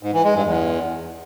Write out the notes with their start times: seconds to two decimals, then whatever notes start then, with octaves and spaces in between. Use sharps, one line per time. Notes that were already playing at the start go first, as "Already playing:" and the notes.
0.03 G#2
0.14 E3
0.24 G#3
0.35 G2
0.45 E2